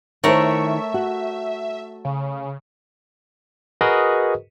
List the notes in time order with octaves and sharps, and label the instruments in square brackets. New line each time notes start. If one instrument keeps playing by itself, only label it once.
[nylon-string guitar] D#3 E4 C5 [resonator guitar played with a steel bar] A3 A#4 C#5 [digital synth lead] E5
[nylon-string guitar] F#4
[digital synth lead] C#3
[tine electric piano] F#4 G#4 A#4 B4 D#5